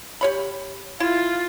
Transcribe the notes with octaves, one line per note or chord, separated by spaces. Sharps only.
G4 C#5 B5
E4 F4